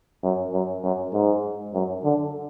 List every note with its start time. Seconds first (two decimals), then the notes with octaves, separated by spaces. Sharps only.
0.24 F#2
0.53 F#2
0.84 F#2
1.13 G#2
1.74 F#2
2.04 D3